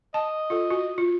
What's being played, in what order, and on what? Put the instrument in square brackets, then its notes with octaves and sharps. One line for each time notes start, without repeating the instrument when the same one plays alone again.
[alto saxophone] D#5 [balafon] A5
[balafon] F4 A4
F#4
F4